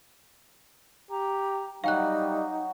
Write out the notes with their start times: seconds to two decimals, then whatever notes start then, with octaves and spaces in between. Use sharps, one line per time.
1.11 G4 A#5
1.84 F#3 G3 D#4 F5 G5 F#6